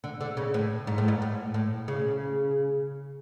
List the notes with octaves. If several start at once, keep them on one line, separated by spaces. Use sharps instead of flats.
D3
D3
C#3
A2
G#2
A2
G#2
A2
A2
C#3